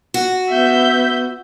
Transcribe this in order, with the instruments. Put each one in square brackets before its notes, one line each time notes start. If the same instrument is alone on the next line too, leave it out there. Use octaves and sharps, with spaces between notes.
[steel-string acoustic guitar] F#4
[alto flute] B3 [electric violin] E5 G6